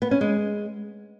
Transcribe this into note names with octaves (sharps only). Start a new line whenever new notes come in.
B3
C#4
G#3